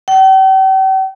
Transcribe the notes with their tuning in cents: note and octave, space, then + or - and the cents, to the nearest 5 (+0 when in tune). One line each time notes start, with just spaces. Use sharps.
G5 -40